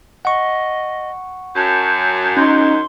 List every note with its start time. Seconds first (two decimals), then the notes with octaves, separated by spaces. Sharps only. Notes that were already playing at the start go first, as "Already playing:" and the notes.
0.25 D#5 F#5 C#6
1.56 F#2 A5
2.37 C#4 D#4 C6